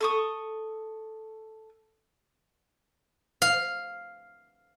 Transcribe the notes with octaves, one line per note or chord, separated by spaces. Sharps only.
A4 C#6 D#6
F5